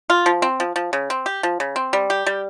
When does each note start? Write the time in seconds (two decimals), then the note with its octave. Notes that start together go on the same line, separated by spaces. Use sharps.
0.10 F4
0.26 F3
0.42 C4
0.60 F3
0.76 F3
0.93 C#3
1.10 C4
1.26 G4
1.43 F3
1.60 C#3
1.76 C4
1.93 G3
2.10 G4
2.27 G3